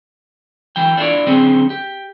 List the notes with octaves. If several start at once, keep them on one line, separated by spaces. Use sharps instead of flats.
E3 F#3 G5
D4 E4 F4 A4 C#5 D5
D3 F#3 C4 C#4 G#4 C5
G4